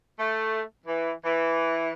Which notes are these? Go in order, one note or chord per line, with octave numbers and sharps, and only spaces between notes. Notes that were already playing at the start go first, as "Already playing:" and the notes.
A3
E3
E3